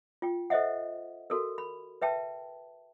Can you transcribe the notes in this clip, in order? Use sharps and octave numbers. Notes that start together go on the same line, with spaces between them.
F4 G5
A4 C5 D#5 E5 F#5
F#4 A4 A#4
B5
B4 E5 G5 A5